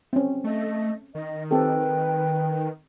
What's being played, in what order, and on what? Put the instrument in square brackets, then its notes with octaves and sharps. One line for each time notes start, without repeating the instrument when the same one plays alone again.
[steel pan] C4 C#4
[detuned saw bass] A3 [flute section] D#5
[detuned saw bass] D#3 [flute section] D#5
[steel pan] C4 G4 A4 [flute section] B4 G5